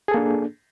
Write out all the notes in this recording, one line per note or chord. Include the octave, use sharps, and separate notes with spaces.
A#3 D4 G#4 A4